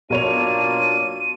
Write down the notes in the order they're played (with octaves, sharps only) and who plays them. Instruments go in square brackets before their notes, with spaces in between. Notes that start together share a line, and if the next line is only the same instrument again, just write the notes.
[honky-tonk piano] B1 C#5 F7 [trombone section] A#3 D4 F4 [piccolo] D#7